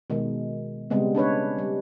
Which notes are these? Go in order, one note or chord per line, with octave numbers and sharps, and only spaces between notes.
B2 D#3 G#3
C#3 G3 G#3 B3 C4
C#4 D4 B4 C#5
G3